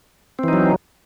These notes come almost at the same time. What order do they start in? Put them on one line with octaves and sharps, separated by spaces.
C4 E3 D#4 F#3